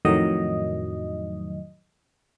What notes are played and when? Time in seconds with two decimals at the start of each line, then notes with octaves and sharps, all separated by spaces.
0.05 F2 A2 D#3 F#3 D#5